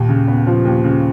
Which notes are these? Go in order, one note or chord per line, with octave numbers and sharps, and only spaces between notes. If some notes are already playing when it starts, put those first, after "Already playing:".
Already playing: D#2 A#2
C#3
B3
F3
D#2
C#3